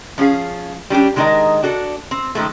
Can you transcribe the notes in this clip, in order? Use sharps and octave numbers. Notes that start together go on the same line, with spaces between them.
F3 C#4 F4 G#4 F5
G3 C#4 D4 G4
D#3 G#3 D4 G#4 A#4 D#5
D4 F#4 A4
C4
D#3 F3 G#3 A3